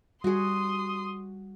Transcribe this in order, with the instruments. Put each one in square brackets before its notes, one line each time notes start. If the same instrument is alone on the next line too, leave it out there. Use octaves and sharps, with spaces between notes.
[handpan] G3 [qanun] F#4 G#4 [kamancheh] C6 D#6